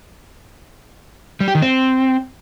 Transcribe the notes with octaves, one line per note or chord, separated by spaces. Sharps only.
G3
G4
D#3
C4